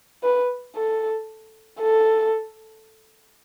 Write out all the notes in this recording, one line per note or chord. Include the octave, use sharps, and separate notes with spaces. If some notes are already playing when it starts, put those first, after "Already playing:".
B4
A4
A4